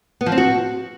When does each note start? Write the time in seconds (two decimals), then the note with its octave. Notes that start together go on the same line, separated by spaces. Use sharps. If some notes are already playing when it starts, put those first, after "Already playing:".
0.21 B3
0.26 F3
0.32 C4
0.38 F#4